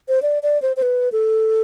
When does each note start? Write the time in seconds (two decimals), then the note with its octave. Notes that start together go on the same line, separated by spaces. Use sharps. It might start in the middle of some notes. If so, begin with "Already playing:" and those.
0.08 C5
0.22 D5
0.43 D5
0.62 C5
0.77 C5
0.82 B4
1.12 A4